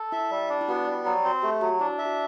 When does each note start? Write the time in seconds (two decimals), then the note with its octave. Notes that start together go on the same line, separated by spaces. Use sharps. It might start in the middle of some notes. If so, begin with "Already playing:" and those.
Already playing: A4
0.12 E4 E5
0.31 G3
0.50 D4
0.61 E4
0.68 B3 F#4
0.87 G3
1.05 F#3
1.24 C4
1.43 A3 G4
1.61 F#3 F#4
1.80 D4 E4
1.99 E5
2.06 F#4